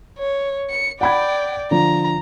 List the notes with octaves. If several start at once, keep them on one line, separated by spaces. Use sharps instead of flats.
C#5
C#7
D5 F#5 G5 B5 G#6
D3 F3 A#5